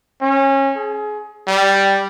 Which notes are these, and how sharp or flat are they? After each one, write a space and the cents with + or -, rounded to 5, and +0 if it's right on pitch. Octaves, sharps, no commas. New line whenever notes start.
C#4 -25
G#4 +25
G3 +0